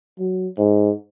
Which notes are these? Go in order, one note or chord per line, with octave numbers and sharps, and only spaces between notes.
F#3
G#2